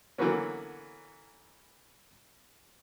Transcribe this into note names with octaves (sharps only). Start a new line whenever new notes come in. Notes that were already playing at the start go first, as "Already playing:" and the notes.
D3 E3 F#3 A#3 B3 C#4